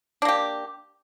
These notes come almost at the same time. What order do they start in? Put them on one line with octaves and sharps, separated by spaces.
D4 A#3 G4